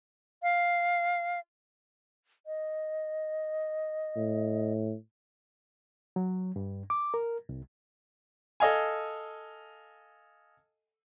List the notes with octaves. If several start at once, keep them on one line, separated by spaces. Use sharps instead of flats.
F5
D#5
A2
F#3
G2
D6
A#4
C2
A4 D#5 F5 G#5